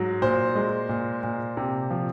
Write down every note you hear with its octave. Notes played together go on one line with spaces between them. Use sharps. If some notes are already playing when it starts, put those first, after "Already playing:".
Already playing: G#2 F#3
A#2 C5
G#3
A#2
A#2
C3
F3